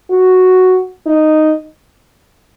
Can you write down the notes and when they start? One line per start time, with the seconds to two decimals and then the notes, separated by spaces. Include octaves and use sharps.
0.11 F#4
1.06 D#4